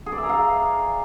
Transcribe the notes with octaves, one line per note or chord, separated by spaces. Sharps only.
G#4
D5
E5
A#5
F5